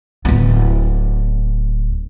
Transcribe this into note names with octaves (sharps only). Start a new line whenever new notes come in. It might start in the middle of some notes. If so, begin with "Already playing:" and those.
D1 B3